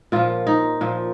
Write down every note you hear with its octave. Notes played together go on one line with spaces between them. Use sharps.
A#2 F3 F4
D#4
A#2 F3